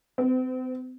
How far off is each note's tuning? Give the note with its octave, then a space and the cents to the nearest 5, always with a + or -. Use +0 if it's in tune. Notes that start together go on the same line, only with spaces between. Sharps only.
C4 -40